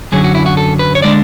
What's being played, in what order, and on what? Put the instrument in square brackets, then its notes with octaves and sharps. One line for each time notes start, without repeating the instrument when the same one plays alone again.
[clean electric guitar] F#2 D3 F#3 C#4 G#4
F#4
E4
F#4
A4
B4
C#5
D3 G#3 D4 D5